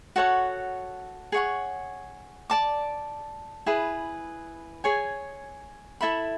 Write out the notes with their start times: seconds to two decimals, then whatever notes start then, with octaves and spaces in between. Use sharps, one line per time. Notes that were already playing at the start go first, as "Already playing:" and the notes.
0.16 F#4 A4 C#5 F#5
1.32 G#4 C#5 F#5 C#6
2.50 D5 A5 D6
3.66 E4 G#4 B4
4.84 G#4 C#5 G#5
6.01 E4 A4 E5 B5